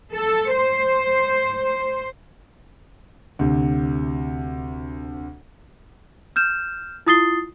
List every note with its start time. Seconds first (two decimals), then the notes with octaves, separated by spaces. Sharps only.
0.13 A4
0.55 C5
3.39 D2 C3
6.36 F6 G6 E7
7.06 E4 F4 D#6 A6 C7 G7